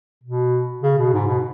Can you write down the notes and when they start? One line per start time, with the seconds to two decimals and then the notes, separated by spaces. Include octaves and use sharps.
0.24 B2
0.83 C#3
0.98 B2
1.13 G#2
1.27 B2